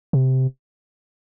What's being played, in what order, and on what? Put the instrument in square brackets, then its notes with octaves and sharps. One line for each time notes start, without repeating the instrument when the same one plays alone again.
[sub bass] C3